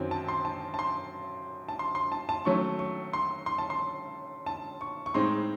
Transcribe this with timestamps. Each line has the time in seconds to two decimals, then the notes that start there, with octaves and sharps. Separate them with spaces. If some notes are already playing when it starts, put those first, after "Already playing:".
Already playing: F#2 D#3 F#3 C4
0.11 A5
0.28 C6
0.45 A5
0.74 A5
0.79 C6
1.69 A5
1.79 C6
1.95 C6
2.12 A5
2.29 A5
2.45 D#3 F#3 A3 C#4 C#6
2.79 C#6
3.13 C6
3.46 C6
3.58 A5
3.70 C6
4.46 A5
4.81 C#6
5.06 C#6
5.14 A2 G#3 C4 D#4 C6